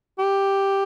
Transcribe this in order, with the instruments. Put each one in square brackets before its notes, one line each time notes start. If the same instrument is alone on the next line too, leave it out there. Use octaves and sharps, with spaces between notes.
[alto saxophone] G4